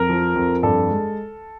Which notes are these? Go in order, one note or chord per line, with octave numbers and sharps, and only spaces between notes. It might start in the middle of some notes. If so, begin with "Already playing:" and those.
Already playing: F2 A#4
F3
F2
G2 A4
G#3